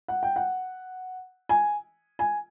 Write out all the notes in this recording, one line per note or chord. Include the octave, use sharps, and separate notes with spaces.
F#5
G5
F#5
G#5
G#5